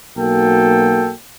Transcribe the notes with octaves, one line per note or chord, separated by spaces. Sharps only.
B1 A#3 F#4 A4 G5